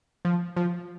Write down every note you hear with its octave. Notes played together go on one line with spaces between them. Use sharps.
F3
F3